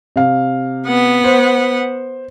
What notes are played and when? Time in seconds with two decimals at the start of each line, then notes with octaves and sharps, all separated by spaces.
0.16 C3 F5
0.86 B3 F#5
1.24 C5